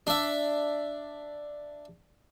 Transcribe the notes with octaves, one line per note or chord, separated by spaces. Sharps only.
D4 E5